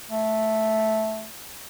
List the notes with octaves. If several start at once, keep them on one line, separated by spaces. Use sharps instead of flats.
A3